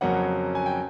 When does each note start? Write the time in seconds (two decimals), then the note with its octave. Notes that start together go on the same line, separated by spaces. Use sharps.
0.01 F2 C#3 F#3 A#3 C#4 F#5
0.55 G#5
0.66 G5